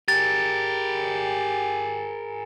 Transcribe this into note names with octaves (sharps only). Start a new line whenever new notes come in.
G4 G#4 A#4 A6